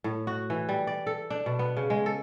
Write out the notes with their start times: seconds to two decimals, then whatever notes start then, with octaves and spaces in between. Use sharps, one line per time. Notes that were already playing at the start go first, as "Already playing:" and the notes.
0.04 A2
0.27 F#4
0.50 E3
0.69 G3
0.87 D5
1.07 A4
1.30 D4
1.46 B2
1.59 B3
1.77 C#3
1.90 G#3
2.06 A4